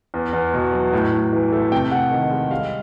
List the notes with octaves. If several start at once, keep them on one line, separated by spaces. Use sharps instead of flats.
E2
E2
B2
F#3
A2
A2
E3
A3
C3 G5
C3 F#5
D#3
G#3
G3 F5